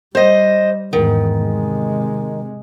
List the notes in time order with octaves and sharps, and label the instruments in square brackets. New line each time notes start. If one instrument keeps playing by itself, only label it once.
[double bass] G3 [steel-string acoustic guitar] C5 D#5
[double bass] E2 G#2 [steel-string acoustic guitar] D#3
[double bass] C3 G#3